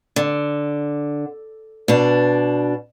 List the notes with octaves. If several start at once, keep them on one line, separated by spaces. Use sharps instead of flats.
D3
B2 D4